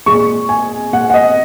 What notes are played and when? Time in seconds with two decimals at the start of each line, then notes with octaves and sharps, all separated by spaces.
0.06 A#2 G#3 C#6
0.49 G#5
0.93 A#2 G#3 F#5
1.10 F#5
1.14 D#5